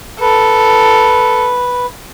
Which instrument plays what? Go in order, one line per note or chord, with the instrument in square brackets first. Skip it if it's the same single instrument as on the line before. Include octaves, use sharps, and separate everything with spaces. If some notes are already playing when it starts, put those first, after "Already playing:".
[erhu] A4 [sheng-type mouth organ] B4